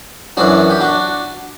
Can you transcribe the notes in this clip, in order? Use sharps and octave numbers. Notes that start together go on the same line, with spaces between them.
F#2 E3 D4 F#4
G4
D4 F#4